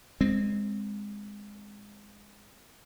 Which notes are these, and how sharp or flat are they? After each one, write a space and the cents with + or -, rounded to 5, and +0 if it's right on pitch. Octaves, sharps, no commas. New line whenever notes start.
G#3 -15 C4 +0